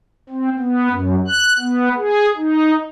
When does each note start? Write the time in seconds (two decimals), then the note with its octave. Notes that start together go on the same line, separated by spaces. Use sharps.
0.30 C4
0.59 B3
0.89 F#2
1.28 F#6
1.60 B3
1.97 G#4
2.37 D#4